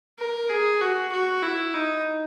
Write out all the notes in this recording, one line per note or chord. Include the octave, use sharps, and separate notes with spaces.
A#4
G#4
F#4
F#4
E4
D#4